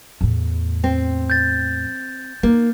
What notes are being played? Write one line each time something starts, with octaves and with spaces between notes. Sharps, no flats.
E2 A2
C4
G6 A6
A#3 D#4